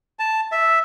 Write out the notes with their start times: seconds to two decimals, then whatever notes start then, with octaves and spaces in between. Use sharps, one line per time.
0.19 A5
0.52 E5